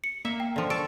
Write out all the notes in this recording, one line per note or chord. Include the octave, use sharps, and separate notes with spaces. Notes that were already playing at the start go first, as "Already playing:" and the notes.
C#7
A#3 E5
G5
D3 F3
A4 C#6 D7